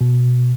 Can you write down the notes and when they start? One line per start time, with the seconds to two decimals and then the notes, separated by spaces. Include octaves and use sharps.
0.01 B2